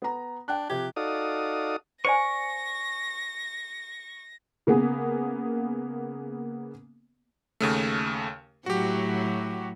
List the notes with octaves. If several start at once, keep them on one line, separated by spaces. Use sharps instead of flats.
B3 A#5
D4 G5 F#6
C3 F3 G4 G#6
D#4 F#4 A4 D5 F5 D#6
C5 D5 G#5 C#6 A#6
C#3 A#3 B3 G#4
D#2 C#3 A3
A2 F#3 F#4 G4